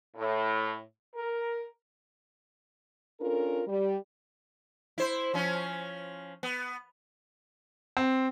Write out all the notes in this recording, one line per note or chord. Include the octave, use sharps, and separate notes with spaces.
A2
A#4
C#4 D4 F4 A4 A#4
G3
E4 C5
F3 C#4
B3
C4